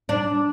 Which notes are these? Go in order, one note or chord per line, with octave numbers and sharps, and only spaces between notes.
D4